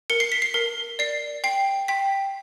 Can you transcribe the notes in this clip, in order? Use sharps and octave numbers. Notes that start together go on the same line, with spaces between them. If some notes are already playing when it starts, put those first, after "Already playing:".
A#4 C#7
C7
B6
C7
A#4
D5 C7
G5 C7
G5 B6